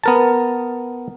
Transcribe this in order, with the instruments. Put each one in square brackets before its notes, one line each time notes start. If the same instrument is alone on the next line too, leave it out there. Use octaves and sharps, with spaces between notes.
[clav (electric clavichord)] B3 A#4 A5